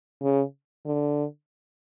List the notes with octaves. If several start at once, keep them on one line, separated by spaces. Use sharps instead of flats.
C#3
D3